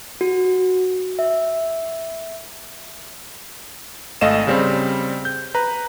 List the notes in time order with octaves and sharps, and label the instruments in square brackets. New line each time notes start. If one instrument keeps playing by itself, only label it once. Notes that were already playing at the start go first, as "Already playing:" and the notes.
[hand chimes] F#4
E5
[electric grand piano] G#1 A3 D#5 F5 E7
C#3 G3 C4
G6
B4 A#5